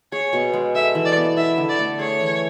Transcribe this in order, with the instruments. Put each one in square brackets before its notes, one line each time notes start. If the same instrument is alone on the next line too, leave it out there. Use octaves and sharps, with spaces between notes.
[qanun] G#4 [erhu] C#5
[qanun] B2
G#3
[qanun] A4 [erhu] E5
[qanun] E3
[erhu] D5
[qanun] B3
[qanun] E4 [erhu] E5
[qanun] D3
[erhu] D5
[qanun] A3
[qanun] G#4 [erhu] C#5
[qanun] E3